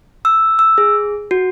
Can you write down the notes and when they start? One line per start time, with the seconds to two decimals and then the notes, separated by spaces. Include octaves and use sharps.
0.25 E6
0.59 E6
0.78 G#4
1.31 F#4